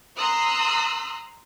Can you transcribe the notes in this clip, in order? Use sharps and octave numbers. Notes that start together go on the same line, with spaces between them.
A#5 C6 D#6 E6 F#6